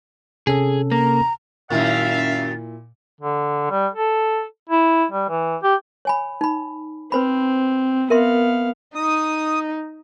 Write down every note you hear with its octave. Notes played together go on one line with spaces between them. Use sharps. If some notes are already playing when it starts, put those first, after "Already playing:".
C3 C#4 G#4 A4
A#3 A#5
F#2 A#2 D#3 E4 E5 F5 A6
D3
G3
A4
E4
G3
E3
G4
C#5 G#5 B5
D#4 B5
C4 B4 C5 B5
B3 A#4 E5 F5 C6
D#4 D#6